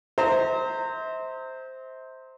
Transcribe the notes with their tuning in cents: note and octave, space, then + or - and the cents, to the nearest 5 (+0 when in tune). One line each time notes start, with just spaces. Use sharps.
C5 +0 E5 -45 A#5 -25